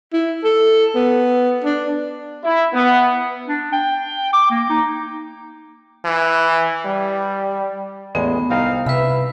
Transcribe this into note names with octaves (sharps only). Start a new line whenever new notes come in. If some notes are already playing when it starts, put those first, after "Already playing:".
E4
A4
B3
D4
E4
B3
D4
G5
D6
A#3
D#4
E3
G3
A1 E2 G#3 B3
C2 C4 D#4 F5
C3 B4 E5 B5